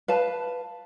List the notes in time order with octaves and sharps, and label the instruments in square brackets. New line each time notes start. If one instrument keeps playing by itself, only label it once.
[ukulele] B4 F5 A5